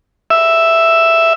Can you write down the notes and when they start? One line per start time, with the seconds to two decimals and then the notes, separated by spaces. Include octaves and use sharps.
0.30 E5